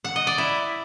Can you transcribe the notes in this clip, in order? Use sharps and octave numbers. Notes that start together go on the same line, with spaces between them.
F#5
D#5
D5
E4